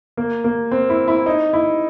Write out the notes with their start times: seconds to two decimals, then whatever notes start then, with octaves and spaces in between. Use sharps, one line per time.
0.17 A#3
0.44 A#3
0.72 C4
0.89 E4
1.08 E4
1.26 D#4
1.53 E4